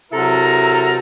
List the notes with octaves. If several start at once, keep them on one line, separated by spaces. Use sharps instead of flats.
C3 F#3 E4 A4 A#4 A#5